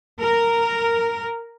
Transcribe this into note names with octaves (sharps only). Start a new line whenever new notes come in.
A#4